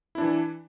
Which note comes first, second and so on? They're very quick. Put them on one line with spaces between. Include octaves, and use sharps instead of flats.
E4 D4 E3